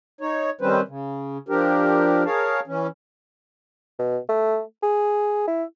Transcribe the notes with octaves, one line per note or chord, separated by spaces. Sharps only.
D#4 C#5
D#3 G3 C4 C#4 B4 C5
C#3
F3 D4 G4 A#4
G#4 A#4 C#5 F5 A5
E3 C#4
B2
A3
G#4
E4